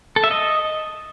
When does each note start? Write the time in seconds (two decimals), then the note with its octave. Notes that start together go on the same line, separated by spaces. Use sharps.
0.16 A4
0.24 E5
0.31 D#5